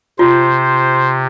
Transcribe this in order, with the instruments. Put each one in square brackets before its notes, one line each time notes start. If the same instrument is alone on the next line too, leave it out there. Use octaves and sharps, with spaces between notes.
[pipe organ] C3 [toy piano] F4 [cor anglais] C5